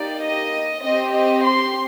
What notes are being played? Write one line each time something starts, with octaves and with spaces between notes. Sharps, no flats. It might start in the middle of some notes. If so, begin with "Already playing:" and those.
Already playing: A#3 D#4 G4 D5
D#5
C4 G4 D#5
D#5
C6